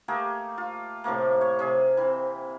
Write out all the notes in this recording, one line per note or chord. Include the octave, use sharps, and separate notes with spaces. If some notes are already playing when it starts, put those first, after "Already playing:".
A3 A#3 G4 G#4
F4
A2 C3 A3 A#3
C#5
C3 G#4
E3 C4